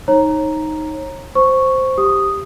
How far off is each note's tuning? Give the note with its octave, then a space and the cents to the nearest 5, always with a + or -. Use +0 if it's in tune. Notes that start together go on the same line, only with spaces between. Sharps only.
D#4 +0 C#5 -35 A#5 +0
C5 +0 C#6 +0
G4 +0 D#6 -5